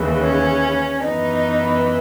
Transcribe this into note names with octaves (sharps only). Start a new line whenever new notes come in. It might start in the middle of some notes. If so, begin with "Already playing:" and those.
Already playing: D#2 C#3 E3
C#4
F#2 E3 B3 D#4